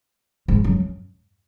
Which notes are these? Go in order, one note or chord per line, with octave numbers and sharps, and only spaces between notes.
G#2
F#2